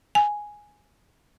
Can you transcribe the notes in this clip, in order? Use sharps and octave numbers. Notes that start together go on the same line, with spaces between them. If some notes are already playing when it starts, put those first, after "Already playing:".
G#5